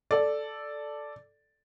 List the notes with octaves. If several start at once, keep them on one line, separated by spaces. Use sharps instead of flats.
A4 D5